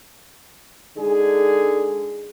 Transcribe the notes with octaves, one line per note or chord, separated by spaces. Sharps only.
D3 G#3 D#4 G#4